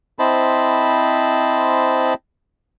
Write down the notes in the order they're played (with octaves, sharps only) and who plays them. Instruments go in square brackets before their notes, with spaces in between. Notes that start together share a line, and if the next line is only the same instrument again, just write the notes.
[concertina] C4 E4 C5 D#5 A5 B5